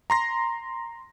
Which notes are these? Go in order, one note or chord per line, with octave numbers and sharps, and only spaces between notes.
A#5 C6 A#6